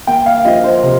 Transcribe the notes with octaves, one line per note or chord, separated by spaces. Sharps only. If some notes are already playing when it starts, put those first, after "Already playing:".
A#3 G5
F5
F3 D#5
C5
C3